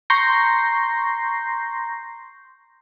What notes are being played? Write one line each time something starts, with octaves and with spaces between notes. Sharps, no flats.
A#5 C6 C#6 G6 A#6 C7